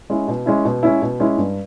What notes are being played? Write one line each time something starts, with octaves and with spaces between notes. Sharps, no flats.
G#3 C#4 E4
B2
G#3 C#4 E4
B2
G#3 C#4 E4
B2
G#3 C#4 E4
G2